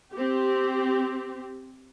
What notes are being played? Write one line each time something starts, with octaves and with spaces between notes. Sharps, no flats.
C4 G4